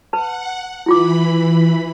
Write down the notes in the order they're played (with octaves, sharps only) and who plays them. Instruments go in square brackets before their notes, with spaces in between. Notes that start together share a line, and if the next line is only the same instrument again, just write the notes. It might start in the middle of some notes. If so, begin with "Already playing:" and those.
[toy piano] B4 A5 [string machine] F#5
[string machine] E3 B5 [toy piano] E4 F4 D6